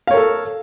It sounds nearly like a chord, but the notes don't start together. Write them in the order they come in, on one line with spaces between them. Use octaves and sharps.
F5 C#5 A#4 A4